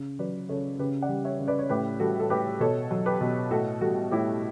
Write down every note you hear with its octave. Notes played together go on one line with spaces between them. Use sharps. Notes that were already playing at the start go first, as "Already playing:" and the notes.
Already playing: C#3
F#3 B4 D5
C#3 A4 C#5
C#3 G4 B4
D5 F#5
G3
C#5 E5
C#3
B4 D5
C#5
A2 G4 B4
G3 F#4 A4
A4
A2 G4 B4
B2 A4 C#5
F#3
G4 B4
B2
A2 F#4 A4
G3 F#4 A4
A2 E4 G4